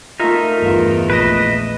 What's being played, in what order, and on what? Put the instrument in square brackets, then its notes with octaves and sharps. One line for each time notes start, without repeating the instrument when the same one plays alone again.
[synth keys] A3 F4 [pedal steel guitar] D#4 A#4 E5
[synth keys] G1 F4 [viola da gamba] E2 A3
[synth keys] A#1 D7 E7 [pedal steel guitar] B4 D#5